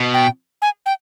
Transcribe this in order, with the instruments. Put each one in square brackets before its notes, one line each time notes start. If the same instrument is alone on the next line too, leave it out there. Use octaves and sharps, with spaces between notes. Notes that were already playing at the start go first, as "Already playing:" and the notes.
Already playing: [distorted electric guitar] B2
[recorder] G5
G#5
G5